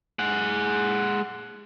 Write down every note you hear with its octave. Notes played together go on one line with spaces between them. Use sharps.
G#3 F#5